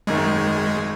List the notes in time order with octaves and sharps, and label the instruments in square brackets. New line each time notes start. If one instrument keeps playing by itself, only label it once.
[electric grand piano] G#1 F#2 D#3 [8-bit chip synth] G#3